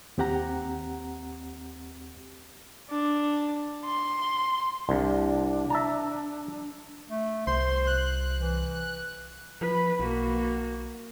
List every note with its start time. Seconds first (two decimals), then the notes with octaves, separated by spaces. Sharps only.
0.18 D#2 C4 G4 F#5 A#5
2.91 D4
3.86 C6
4.89 C2 D4
5.70 E5 A5 A#5
7.10 A3
7.47 C2 C5 C6
7.87 F#6
8.38 E3
9.61 F3 B4 B5
10.00 B1 A#3 F#4